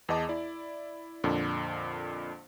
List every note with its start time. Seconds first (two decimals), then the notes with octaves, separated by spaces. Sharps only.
0.09 E2 B3 G#4 D#5 A5 D6
0.29 E4 D5
1.24 F2 A#2 D3 D4